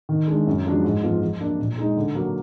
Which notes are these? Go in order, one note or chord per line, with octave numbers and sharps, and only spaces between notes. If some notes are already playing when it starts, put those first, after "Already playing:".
D#3
G#3 D4
F#2
F3 G#3 D4 F#4
G#2
F3 B3 F4
F3
A#3 D4
A#2
G#3 D#4
D3
F#3 A#3